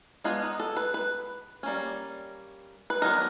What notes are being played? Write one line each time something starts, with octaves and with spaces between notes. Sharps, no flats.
G#3 B3 D4 F4
D#4
A4
B4
B4
G3 A#3 C#4
B4
D#3 F#3 B3 D4 A#4